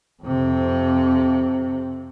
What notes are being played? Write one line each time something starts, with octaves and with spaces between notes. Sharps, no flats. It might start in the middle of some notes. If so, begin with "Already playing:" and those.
F2 C3